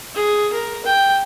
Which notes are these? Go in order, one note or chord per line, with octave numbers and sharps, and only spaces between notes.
G#4
A#4
G5